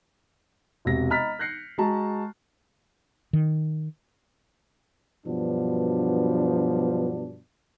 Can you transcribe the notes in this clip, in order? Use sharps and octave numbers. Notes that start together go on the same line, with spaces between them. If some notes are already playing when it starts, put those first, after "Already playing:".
E1 C3 A#6
D#5 A#5 B5 F6 A6 B6
F#6 G6 A#6 C7 C#7
G#3 F#4 A5 A#5
D#3
G2 B2 F3 F#3 B3 D4